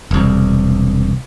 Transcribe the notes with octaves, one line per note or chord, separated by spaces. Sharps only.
E1 C2